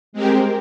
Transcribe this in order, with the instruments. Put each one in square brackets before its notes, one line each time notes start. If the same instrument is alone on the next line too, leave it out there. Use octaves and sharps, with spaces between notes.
[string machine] G#3 C4 G4 A#4